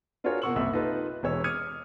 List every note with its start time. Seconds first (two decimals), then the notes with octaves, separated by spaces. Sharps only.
0.24 D4 F4 F#4 G#4 A#4 C#5
0.42 B2 A#3 F#5 C#6 E6 F#7
0.55 F#1 C2 E5 E6
0.73 D#4 F4 G4 A4 B4
1.23 E1 E3 C#5 E6
1.44 D6 D#6 F6 G#6 C#7 D#7